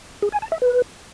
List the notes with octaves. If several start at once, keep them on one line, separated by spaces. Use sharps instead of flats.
G#4
G#5
A5
E5
B4